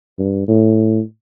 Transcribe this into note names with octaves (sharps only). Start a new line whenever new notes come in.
G2
A2